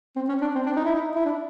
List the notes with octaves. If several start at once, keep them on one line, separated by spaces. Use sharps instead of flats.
C4
C#4
D4
C4
D4
D#4
E4
D#4
E4
D4